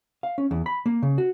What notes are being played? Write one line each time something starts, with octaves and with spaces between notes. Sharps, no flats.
F5
C#4
E2
B5
A#3
C#3
F#4